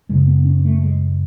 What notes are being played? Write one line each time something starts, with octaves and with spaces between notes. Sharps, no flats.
F#2 C#3 G#3
B3
C#4
A3
G#3